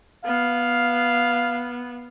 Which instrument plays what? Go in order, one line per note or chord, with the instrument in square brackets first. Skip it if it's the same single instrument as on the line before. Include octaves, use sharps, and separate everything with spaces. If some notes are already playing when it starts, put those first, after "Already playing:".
[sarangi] B3 [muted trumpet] F5